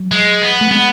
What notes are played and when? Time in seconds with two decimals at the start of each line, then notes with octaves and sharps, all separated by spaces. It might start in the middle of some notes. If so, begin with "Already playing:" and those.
Already playing: F#3
0.11 G#3
0.42 B3
0.61 A3
0.71 G#3 B3